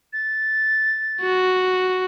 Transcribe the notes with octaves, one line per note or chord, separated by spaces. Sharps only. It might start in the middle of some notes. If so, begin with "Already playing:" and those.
A6
F#4